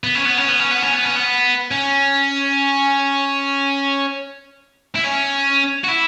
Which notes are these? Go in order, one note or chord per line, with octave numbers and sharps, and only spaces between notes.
B3
C#4
B3
C#4
B3
C#4
B3
C#4
B3
C#4
B3
C#4
E4
C#4
F#4
E4